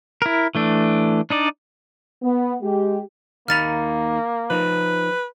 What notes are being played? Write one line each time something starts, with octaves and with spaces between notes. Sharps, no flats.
E4 A#4
E3 A3 D4
D4 D#4 D5
B3
G#3 G4
D#2 A#3 D#4 B5 F6 A6 F7
F3 D#4 B4